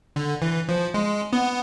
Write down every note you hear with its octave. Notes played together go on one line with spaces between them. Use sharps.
D3
E3
F3
G#3
B3